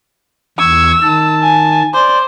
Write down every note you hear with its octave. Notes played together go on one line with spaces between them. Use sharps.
E2 C#6 E6 G#6
D#3 A5
G#5
C5 D5